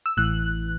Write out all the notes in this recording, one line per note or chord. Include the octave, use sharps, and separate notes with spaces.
E6
A1 A2 E3 F#6